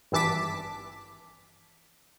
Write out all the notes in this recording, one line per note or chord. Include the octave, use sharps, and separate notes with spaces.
G#1 G2 E3 A5 D6 B6